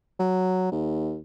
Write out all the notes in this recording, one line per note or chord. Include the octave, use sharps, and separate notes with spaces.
F#3
D#2